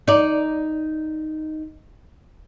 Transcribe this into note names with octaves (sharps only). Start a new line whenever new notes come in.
D#4 D5